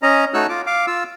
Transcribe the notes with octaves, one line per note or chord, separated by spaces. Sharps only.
C#4 D#5 A#5
A3 D#4 F#4 C#5 E6 F#6
F4 D6
F5 D6
F4 E6